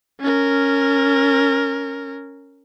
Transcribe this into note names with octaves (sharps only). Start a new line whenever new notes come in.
C#4 A#4